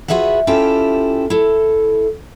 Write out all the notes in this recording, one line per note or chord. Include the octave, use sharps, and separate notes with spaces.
F4 F#4 G#4 B4 E5 F#5
C#4 E4 F4 G4 A4 G5
E4 A4